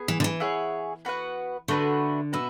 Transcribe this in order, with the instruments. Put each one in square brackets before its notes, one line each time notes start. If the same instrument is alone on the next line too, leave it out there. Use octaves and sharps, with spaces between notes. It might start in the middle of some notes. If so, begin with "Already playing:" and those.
Already playing: [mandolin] B3 G#4
[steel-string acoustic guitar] E3
D3
E3
[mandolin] E4 G#4 C#5 F#5
B3 F#4 B4 F#5
[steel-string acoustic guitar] D3 [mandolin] A3 D4 F#4 B4
[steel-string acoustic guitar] B2 [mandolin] F#4 B4 E5